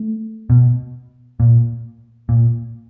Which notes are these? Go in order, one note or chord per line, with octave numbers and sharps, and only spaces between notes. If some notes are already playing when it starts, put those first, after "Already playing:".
Already playing: A3
B2
A#2
A#2